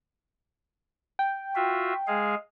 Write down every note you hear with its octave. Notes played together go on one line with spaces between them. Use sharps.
G5
F4 F#4 E5
G#3 G#4 F5